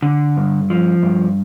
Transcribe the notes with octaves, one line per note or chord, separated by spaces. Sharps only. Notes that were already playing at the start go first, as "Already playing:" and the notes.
D3
G2
F3
G2